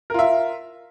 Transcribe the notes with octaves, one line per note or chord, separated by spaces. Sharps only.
F4 A#4 E5